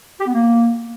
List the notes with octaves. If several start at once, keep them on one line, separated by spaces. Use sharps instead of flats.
G4
B3
A#3